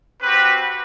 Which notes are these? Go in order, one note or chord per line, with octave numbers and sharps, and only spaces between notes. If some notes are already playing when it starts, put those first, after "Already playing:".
C4 F#4 G4 B4